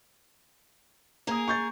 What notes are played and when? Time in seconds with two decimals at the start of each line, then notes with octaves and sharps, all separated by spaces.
1.27 A#3 G#4 A#4 A#5 D#6
1.48 C#6 G6 A6